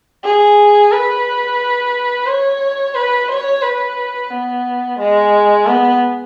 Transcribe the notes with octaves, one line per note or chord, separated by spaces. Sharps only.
G#4
B4
C#5
B4
C#5
B4
B3
G#3
B3